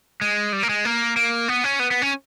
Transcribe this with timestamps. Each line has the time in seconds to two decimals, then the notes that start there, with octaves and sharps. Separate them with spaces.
0.21 G#3
0.53 G3
0.63 A#3
0.69 G#3
0.85 A#3
1.17 A#3
1.48 B3
1.64 C#4
1.80 B3
1.91 B3
2.02 C#4